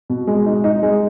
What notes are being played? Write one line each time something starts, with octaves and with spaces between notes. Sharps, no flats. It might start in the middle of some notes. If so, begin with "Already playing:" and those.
B2
G#3
D#4
D#4
G#3